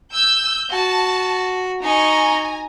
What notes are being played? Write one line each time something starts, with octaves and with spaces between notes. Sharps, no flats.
E6 G6
F#4 A5
D#4 G#5 A#5 C#6